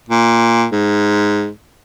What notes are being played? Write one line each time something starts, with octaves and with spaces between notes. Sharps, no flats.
A#2
G#2